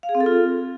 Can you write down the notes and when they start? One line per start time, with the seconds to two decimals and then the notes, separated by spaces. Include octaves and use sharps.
0.03 F5
0.09 G#4
0.15 C4
0.20 A4
0.26 F4